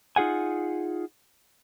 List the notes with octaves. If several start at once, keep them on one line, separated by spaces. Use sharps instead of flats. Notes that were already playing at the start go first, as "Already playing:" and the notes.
D#4 F4 G#4 F#5 G#5